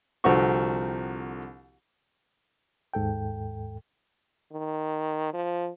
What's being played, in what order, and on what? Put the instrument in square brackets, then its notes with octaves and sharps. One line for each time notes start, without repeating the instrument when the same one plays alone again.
[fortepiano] C2 D3 F3 C4 F#4 C#6
[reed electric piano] D#2 G#2 A4 G5
[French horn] D#3
F3